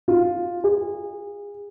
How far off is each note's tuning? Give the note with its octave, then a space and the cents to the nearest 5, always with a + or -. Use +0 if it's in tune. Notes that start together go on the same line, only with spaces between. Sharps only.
F4 +5
G#4 -30